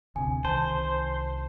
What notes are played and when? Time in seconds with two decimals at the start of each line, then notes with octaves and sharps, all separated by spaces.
0.16 D2 C3 G#5
0.45 C2 D#3 C5 A5